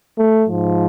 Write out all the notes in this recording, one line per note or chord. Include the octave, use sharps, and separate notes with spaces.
A3
G#2 F3